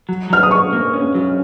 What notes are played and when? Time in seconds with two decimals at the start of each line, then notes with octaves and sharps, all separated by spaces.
0.09 F#3
0.30 F#3 F6
0.43 D#6
0.50 F#2 C#6
0.73 A#3
0.93 C#4
1.15 F#3